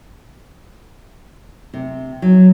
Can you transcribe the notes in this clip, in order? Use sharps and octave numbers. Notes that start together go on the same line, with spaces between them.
C3
F#3